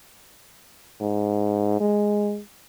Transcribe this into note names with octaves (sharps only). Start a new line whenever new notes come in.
G#2
G#3